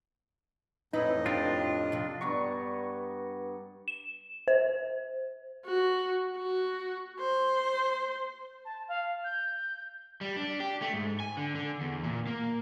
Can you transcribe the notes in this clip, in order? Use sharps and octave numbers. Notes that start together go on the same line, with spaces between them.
F2 A2 E3 D#4 E4 B4 D#5
D4 F4 G4
C3 F3
G2 B3 A#5 C#6
E7
C5
F#4
F#4
C5
A5
F5
G6
G3
D4
G4
A3
G#2
G#5
D3
D3
E2
A#2
A#3